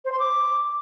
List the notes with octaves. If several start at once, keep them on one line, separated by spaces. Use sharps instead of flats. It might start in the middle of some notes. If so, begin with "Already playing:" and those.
C5
C6
D6